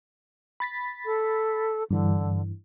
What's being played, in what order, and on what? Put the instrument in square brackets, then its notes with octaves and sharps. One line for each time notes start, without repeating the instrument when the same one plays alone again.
[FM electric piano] B5 A6 B6
[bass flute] A4
[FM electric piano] G2 E3 [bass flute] D3